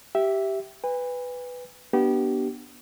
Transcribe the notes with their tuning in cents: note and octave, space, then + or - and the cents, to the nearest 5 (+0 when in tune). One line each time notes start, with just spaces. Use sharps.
G4 -10 E5 +0
B4 +10 G#5 -40
B3 -20 D4 +0 G4 -30